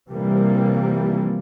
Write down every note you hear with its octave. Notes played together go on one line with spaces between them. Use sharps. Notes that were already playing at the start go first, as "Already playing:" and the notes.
C3 E3 F3 G3 A#3